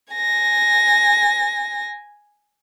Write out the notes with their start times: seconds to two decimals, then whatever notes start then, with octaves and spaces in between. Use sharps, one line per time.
0.13 G#5 A#6